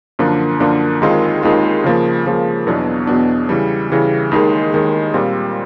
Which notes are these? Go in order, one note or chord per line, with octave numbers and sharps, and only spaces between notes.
F#2 D3 F3 A#3 D4
F#2 D3 F3 A#3 D4
D#2 D#3 G#3 C4 F4
D#2 D#3 G#3 C4 F4
C#3 F3 A#3
C#3 F3 A#3
E2 B2 F#3 B3 D4
E2 B2 F#3 B3 D4
C#3 E3 G3
C#3 E3 G3
D#2 D#3 G#3
D#2 D#3 G#3
A#2 G3 C4 F4